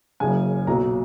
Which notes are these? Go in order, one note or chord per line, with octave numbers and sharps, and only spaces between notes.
F#1 F#2 C#3 G#5
B1 A#2 F#3 A#5